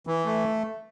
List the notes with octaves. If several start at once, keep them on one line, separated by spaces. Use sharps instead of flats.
E3
A3